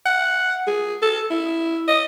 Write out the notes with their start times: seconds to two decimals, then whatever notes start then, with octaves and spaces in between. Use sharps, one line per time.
0.06 F#5
0.67 G#4
1.02 A4
1.30 E4
1.88 D#5